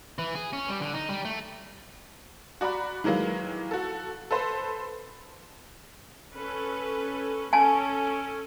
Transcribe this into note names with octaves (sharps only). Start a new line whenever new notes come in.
E3
G#4
C#4
G3
D3
D#4
G3
A3
F#4 D5 A#5 B5 F#6
D#3 E3 F#3 G#3 A#3
F#4 A4
A4 B4 C5
C#4 A4 B4
C#4 A4 G#5 A5